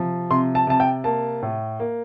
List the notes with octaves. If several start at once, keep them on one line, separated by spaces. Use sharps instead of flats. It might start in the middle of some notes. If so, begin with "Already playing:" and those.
Already playing: C3 F3
C3 C6
A5
C3 A5
G5
A#3 A5
A2
A#3